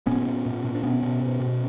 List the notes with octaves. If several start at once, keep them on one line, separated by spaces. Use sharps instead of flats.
A#2 B3 C#4
A#2
A#2
A#2
D4
B2 B3 C#4
B2
B2
B2